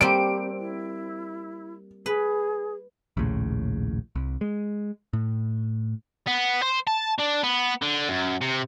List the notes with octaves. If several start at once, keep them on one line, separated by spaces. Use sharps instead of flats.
G3 A#3 C4 G4 D7
E4
G#4 B4
A#1 D#2 A2 C#3
C2
G#3
A2
B3
C5
A5
D4
B3
D3
F#2
C3